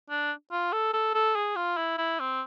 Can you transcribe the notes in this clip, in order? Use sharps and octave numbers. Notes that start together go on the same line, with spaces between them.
D4
F4
A4
A4
A4
G#4
F4
E4
E4
C4